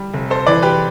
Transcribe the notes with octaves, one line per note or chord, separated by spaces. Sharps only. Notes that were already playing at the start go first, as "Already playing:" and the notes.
Already playing: G3
F1
A4 C5
E3 B4 D5
G4 B4